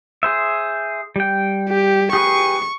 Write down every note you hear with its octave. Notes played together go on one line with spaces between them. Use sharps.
G#4 C5 E5
G3 G5
G4
G4 G#4 B4 C#6